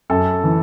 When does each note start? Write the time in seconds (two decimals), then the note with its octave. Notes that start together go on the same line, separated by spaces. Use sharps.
0.10 F#2 A4
0.44 E3